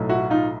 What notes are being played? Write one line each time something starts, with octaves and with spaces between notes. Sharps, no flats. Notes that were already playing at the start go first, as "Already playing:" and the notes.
Already playing: B1 A2 F#3 A3
E4 F#4
D#4 F4